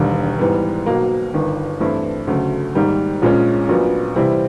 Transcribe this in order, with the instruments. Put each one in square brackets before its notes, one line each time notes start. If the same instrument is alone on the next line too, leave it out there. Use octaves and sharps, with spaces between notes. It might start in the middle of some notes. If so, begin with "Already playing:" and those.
Already playing: [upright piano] E1 D#2 D3 G3
G#2 E3 G3 B3
B1 B2 F#3 A#3
G1 G2 D#3
G2 E3 A3 C4 E4
D2 C#3 F#3 A3
G#2 D#3 G3 A#3
A#1 A#2 F3 G#3 C#4
A#1 A#2 F#3 B3
C3 E3 G3 C4 E4